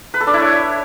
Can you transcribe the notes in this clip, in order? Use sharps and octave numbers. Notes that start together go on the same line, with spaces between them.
B4
A4
D4
E4
C#5